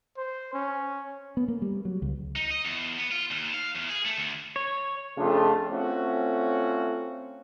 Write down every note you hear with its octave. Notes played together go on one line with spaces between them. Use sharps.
C5
C#4
B3
A#3
G3
F#3
C#2
D#4
D#5
E2
B3
F4
D#2
F5
E2
G#4
A3
D2
C#5
F2 C#3 A3 D4 F4
A3 C4 C#4 F4 F#4